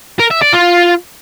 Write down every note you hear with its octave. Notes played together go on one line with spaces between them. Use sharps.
A#4
E5
D5
F4